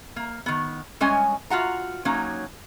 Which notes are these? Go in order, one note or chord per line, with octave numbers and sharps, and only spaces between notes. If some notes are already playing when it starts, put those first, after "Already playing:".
A#3
D#3 B3
G3 G#3 C#4 C#5 D#5 G#5
F4 F#4 F#5 A#5
F#3 A#3 C#4 D#4